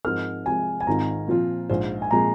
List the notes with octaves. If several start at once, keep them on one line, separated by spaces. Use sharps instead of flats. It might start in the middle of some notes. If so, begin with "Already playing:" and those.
G#2 F3 C4 D#4 A#4 F6
C3 F3 G#3 G#5
G#5
G#1 G#2 D#3 C4 F4 A#5
A#2 F3 C4 F4
A#1 G#2 G#3 F4 C5
G#5
A#2 F3 G#3 C4 A#5